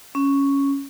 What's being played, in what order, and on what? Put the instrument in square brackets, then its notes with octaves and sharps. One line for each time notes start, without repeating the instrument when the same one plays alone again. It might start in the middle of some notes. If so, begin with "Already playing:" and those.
[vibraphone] C#4